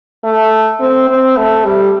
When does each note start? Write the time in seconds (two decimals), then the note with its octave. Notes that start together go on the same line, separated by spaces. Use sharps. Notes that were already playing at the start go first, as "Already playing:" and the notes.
0.24 A3
0.80 C4
1.09 C4
1.37 A3
1.65 G3